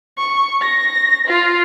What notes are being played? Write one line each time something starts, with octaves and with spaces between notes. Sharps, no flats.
C#6
A#6
F4